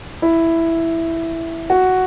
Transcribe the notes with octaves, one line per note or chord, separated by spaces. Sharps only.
E4
F#4